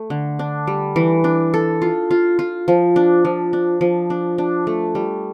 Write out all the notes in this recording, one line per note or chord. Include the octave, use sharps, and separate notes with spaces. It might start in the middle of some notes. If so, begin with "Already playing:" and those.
Already playing: A3
D3
D4
G3
E3
D4
A4
F4
F4
F4
F3
D4
F3
D4
F3
D4
D4
A3
G3